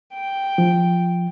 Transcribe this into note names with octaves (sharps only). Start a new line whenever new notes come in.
G5
F3